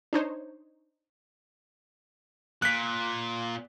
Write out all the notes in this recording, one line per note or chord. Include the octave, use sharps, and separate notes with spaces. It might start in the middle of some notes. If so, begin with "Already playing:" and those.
D4 D#4 C5 C#5
A#2 F#6 B6